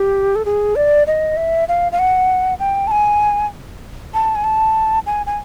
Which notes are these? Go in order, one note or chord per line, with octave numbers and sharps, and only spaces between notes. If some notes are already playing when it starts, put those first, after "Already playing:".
Already playing: G4
A4
G#4
D5
D#5
E5
F5
F5
F#5
G5
A5
G#5
A5
G#5
A5
G#5
G#5